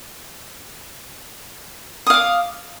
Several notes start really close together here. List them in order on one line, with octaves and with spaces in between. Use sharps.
D#6 F5 D6